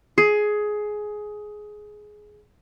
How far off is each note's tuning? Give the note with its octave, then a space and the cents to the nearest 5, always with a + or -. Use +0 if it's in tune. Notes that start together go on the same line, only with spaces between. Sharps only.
G#4 +15